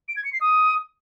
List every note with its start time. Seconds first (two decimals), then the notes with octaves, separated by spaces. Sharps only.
0.08 D7
0.17 G#6
0.25 C#7
0.33 C7
0.41 D#6